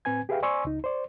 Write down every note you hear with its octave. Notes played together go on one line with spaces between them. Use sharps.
A2 C4 B4 G#5 G#6
G4 G#4 B4 E5 F5 G5
C5 D5 G#5 C6 C#6 E6
C#2 D#4
C5 D5